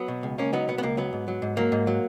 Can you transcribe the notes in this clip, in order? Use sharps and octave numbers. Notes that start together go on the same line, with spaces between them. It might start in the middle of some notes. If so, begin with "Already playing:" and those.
Already playing: F#3 B3
B2
C#2
C#2 A#3 C#4
F#3 B3 D#4
B2 B3
B3
C#2 A#3
F#3 B3
G#2
F#3
G#2
F#3 A#3
G#2
F#3